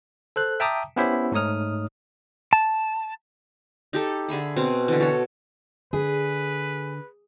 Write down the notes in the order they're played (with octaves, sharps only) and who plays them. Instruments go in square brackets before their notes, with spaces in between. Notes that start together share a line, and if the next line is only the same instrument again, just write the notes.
[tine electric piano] A4 C5 F#6
E5 G5 A5 A#5 D6 D#6
B3 C#4 E4 G4 C5 E5
G#2 A3 D#4 C#5 D#6 F6
[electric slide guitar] A5
[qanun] D#4 G4 A4
D3 G#4 E5 B5
B2 C4
D3 E3
F#4 A4 C#5
[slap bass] D3 [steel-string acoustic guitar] G#4 [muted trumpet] B4